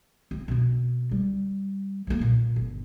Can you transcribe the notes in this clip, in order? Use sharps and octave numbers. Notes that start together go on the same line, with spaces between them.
E2 C4
B2 C4
G3
E3 A#3
A#2
G1